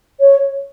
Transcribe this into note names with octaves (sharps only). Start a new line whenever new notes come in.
C#5